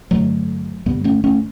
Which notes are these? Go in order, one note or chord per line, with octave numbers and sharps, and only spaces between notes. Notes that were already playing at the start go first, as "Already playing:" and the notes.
A1 G2 D3 F#3 A3
A1 G2 D3 G3 B3
A3 C#4
A3 C#4